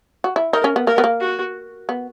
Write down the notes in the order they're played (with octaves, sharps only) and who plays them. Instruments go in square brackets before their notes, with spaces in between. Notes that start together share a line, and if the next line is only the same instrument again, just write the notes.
[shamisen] F#4
E4
[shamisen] D#4 [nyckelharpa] A#4
[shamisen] C#4
B3
[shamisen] A#3 [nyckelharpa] A#4
[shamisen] B3
A#3
[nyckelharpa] F#4
[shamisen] B3